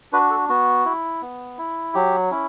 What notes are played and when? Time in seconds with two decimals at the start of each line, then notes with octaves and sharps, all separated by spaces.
0.13 D4 F#4 B4
0.30 A4
0.49 B3 F#4
0.85 E4
1.22 B3
1.58 E4
1.94 F#3 G4
2.31 C#4 E4